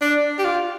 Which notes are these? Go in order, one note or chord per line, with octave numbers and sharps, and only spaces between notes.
D4
G4
F4